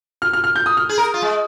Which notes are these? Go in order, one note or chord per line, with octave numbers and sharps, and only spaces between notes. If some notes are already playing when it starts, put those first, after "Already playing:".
F6
F6
F6
G6
D#6
F6
G#4
A#4
F4
G#3